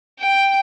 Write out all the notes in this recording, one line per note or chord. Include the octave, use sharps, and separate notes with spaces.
G5